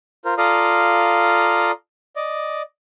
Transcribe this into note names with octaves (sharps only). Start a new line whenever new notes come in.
F4 A#4 C5
F4 A4 D5 F5 A#5 D#6
D5 D#5